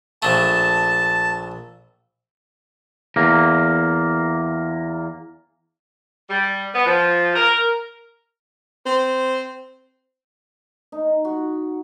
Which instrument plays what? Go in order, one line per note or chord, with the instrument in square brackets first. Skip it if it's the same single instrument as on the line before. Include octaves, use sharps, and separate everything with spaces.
[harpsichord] A#1 A3 [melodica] A5
[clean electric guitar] E2 A#3
[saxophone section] G3
B3
F3
A#4
[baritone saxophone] C4
[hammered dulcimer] D#4
F#4